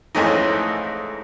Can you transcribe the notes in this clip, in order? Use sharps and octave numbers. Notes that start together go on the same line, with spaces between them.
F2 G#2 E3 A3 C#4 D#4